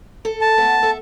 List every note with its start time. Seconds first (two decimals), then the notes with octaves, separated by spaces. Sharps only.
0.25 A4
0.41 A5
0.58 A3 B3
0.83 A4 E5